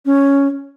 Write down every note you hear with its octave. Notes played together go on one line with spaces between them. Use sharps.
C#4